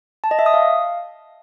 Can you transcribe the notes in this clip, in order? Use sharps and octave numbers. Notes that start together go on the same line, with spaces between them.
A5
D#5
E5
D#6
F5